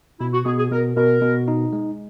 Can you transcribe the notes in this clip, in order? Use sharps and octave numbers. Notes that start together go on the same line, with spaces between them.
B2 E4
F#4
B2 G#4
G#4
B2 A#4
B2 A#4
B2
D#4
G#3